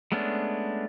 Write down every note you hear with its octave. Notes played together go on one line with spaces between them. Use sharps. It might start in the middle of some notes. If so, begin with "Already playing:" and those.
G#3 A3 B3 C#4 D4